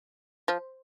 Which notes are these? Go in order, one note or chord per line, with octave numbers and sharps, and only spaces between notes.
F3